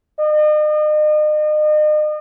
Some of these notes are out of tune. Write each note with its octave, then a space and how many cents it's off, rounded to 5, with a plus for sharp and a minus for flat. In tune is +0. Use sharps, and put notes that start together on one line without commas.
D#5 -40